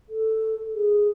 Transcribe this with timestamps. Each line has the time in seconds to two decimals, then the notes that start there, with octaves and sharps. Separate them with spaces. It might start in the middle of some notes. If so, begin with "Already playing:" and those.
0.09 A4
0.75 G#4